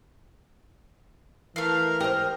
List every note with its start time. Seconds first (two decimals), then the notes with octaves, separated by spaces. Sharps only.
1.56 E3 A3 A#4 F5
2.00 G4 C5 D#5 D#6 F6